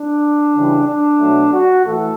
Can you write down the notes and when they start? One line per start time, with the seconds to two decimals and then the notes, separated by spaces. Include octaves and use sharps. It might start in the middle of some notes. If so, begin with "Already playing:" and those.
Already playing: D4
0.54 C#3 E3 G3
0.87 D4
1.19 B2 F#3 A3
1.52 F#4
1.84 A2 E3 A3 A4